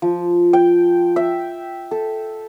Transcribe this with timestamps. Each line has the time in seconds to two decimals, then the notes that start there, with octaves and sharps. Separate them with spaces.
0.02 F3
0.53 G5
1.16 E5
1.91 A4